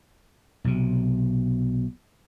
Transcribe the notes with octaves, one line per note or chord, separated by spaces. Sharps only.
B1 C3